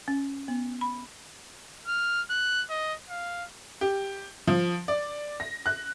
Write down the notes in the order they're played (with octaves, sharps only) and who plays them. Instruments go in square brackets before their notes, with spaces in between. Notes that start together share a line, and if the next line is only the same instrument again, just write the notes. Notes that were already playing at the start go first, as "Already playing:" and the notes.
[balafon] C#4
B3
B5
[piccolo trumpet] F6
F#6
D#5
F5
[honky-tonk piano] G4
F3
D5
A#6
F#6